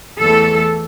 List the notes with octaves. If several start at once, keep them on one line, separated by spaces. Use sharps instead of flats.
E2 E3 A3 A4